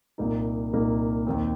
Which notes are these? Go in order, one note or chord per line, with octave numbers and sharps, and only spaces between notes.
C2 A#2 A#3 D#4
C2 A#2 A#3 D#4
D#2 D#3 C4